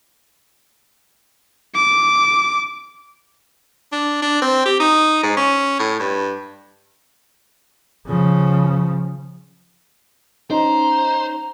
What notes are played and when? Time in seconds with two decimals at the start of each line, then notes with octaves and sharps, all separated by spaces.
1.75 D6
3.92 D4
4.22 D4
4.42 C4
4.66 G4
4.80 D#4
5.23 G#2
5.37 C#4
5.79 A2
6.00 G2
8.07 C#3 F3
10.51 C#4 D#4 C5 A#5